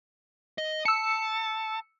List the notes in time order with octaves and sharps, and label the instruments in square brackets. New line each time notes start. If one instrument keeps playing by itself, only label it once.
[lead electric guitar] D#5
[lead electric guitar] A5 [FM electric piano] E6 C#7